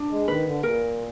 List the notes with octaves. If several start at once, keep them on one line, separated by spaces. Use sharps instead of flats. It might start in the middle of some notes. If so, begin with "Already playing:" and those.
Already playing: D4
G#3
D#3 B4
D3
A#2 A#4